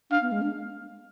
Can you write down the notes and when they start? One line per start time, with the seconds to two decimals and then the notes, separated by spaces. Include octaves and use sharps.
0.10 D4 F5
0.22 B3
0.32 G#3
0.42 D4